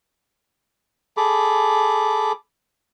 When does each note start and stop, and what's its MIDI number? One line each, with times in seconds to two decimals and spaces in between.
1.17 2.32 68
1.17 2.32 69
1.17 2.32 83
1.17 2.32 86